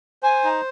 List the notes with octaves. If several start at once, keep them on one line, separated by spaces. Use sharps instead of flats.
C5 G#5
D#4